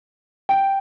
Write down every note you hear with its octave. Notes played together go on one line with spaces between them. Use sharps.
G5